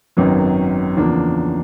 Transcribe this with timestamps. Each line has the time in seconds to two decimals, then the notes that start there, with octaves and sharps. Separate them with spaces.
0.17 G#1 F#2 D#3 F#3 B3
0.96 E2 C#3 F3 A#3 D4